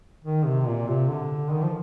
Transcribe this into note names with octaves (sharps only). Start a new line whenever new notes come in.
D#3
C3
A#2
C3
D3
D#3
F3